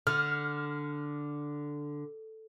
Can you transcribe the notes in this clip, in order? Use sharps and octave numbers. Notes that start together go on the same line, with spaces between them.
D3 F6